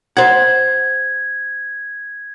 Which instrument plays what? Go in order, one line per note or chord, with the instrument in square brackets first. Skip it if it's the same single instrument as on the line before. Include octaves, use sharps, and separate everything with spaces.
[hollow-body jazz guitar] C5 F#5 [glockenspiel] G#6